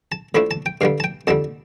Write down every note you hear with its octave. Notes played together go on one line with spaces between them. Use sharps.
A5
A2 F3 A3 D4 B5
A5
G5
G2 D3 G3 F5
A5
G5
F2 D3 G3 A5